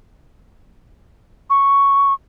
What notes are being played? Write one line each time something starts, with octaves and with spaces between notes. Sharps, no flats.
C#6